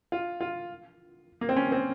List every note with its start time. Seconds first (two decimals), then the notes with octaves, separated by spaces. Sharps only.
0.12 F4
0.41 F4
1.41 A#3
1.49 C4
1.56 C#4
1.72 C4